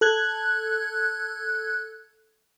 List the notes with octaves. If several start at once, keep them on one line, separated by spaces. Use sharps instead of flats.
A4 F#6 G#6